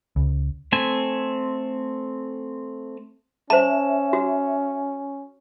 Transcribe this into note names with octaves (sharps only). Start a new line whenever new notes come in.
C#2
A3 C4 G#5
C#4 C5 E5 A5
F#4